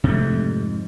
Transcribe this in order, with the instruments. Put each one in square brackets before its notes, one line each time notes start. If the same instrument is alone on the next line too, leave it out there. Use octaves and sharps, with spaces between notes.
[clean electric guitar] F2 G#2 [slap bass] C3 A3